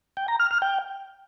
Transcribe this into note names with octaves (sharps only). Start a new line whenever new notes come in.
G5
A#5
F6
F6
G5